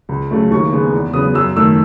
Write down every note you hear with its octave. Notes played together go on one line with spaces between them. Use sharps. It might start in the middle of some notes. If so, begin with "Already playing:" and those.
C#2
C#3 F#3 A3
D#2 C#6
C#3 G#3 B3
E2
C#3 F#3 B3 D#6
F#2 E6
D#3 A3 E6